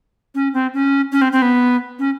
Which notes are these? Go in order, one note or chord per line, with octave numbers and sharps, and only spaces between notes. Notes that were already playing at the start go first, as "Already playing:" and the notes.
C#4
C4
C#4
C#4
C4
C4
B3
C#4